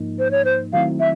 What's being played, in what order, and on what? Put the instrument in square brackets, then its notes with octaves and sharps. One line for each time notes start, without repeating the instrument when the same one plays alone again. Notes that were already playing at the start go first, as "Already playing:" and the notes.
Already playing: [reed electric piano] G#2 F3 A#3 D#4
[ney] C5
C#5
C5
[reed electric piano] D#3 F#3 A3 C4 E4 [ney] F5
[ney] E5